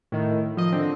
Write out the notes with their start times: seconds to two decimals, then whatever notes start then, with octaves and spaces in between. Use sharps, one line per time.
0.12 A2 D#3
0.57 F3 D#5
0.72 D3 C4